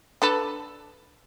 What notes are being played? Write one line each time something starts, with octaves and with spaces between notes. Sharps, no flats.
D4 A4 B4